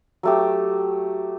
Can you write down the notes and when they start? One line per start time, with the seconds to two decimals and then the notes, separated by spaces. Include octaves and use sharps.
0.23 F#3 A3 G4